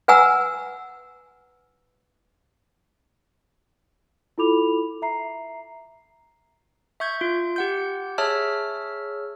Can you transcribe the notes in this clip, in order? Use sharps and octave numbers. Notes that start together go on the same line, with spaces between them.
B4 F#5 G#5 A#5 E6
E4 F4 A4 B5 D6 F7
E5 A#5 C7
E5 C#6 G6 G#6
F4
G4 F#5 G6
G#4 C#5 E5 A5 E6 F6